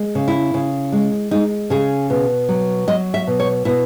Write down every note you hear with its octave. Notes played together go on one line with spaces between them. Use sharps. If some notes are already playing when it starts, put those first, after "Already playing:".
Already playing: G#3
C#3
E4
C#3
G#3
G#3 D#4
C#3 G#4
B2
F#3
F#3 D#5
E5
B2
C#5
B2 E4